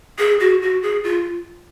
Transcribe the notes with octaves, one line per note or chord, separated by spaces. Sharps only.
G#4
F#4
F#4
G#4
F4